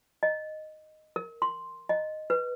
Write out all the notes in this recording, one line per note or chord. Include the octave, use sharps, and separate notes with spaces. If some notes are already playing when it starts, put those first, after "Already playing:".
D#5
A#4
C6
D#5
B4